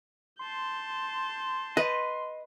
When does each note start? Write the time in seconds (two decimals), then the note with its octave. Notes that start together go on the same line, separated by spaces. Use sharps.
0.39 A5 C6 G6
1.77 B4 D#5